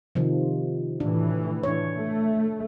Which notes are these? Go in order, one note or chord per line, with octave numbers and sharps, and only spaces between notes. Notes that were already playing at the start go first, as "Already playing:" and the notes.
C3 D#3 F3
A2 E3 D4
D4 C#5
A3